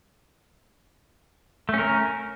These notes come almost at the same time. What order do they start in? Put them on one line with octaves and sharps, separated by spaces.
A3 C#4 A#4